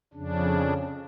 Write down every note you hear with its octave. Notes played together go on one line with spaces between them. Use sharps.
F2 C#3 D4